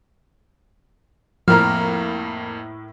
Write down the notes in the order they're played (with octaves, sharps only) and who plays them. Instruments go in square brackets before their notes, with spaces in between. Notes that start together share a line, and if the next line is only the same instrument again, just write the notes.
[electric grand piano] F2 A#3 [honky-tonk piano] A2 A#4 A#5 [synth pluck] F3 [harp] F6